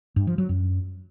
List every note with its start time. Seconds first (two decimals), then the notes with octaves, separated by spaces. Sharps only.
0.16 G2
0.27 F3
0.38 F#3
0.49 F#2